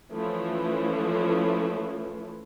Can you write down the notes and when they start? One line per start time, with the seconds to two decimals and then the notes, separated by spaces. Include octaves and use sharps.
0.13 E3 F3 A3 C#4 E4